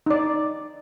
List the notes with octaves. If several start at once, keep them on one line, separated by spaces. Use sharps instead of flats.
D#4 D5